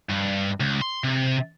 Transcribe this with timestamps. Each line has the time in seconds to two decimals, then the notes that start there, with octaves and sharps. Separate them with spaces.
0.10 G2
0.60 C#2
0.82 C6
1.04 C3